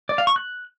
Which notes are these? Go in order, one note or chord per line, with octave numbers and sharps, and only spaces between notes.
D5
F5
C#6
F#6